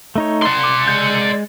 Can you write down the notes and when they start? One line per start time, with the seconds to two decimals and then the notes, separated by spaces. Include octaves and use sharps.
0.16 A3 D#4 C#5
0.42 D5 C6
0.64 D6
0.88 G#3 G6